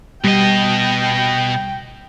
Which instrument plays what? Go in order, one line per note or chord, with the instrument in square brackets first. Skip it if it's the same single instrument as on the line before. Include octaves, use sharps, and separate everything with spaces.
[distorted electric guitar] B2 D#5 [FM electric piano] G3 [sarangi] G5